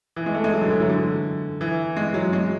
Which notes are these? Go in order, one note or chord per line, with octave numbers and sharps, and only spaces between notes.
E3
G#3
A3
G#3
F#3
D3
E3
F#3
D3
E3
G#3
F#3
G#3